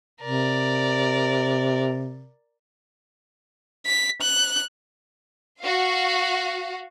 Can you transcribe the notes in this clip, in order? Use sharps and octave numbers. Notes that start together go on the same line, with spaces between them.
C3 A#4 D5
B6
F#6
F#4 F5